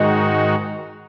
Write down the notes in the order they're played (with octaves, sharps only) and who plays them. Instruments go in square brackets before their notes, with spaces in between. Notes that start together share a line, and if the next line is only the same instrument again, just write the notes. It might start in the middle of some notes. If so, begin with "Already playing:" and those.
Already playing: [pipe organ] G#2 D#3 G#3 D#4 F#4